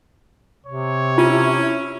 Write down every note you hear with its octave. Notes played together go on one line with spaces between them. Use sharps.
C3 C#5
C#4 E4 F4